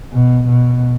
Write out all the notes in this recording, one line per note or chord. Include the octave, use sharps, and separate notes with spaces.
B2
B2